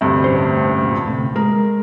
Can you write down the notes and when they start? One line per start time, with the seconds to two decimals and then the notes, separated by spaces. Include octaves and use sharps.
0.01 D2 G2 C3
0.24 A2 C#4 C5
0.82 E2 A#2
1.06 D2 A2 C3
1.36 G#3 A#4